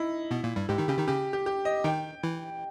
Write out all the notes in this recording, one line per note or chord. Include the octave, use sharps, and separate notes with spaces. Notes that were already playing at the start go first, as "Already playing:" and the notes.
Already playing: D#4 E4
B2 B3
A#2 A#3
G2 G3
G#2 G#3 G4
D#3 D#4
C#3 C#4 G4
D#3 D#4
C#3 C#4 G4
G4
G4
D#5
D#3 D#4 G5
E3 E4